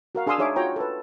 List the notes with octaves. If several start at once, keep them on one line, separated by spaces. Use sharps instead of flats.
F#4 A#4 F5
D4 G#4 F5 C6 D#6 E6
D4 D#4 G#4 C#5 E5 D6
F4 F#4 C#5 G5 A#5
A4 B4